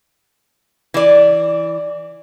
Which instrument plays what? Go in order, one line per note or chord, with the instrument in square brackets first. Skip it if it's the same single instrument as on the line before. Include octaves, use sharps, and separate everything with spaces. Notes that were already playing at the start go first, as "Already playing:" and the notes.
[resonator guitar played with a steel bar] E3 D5